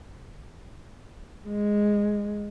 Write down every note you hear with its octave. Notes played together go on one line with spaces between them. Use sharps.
G#3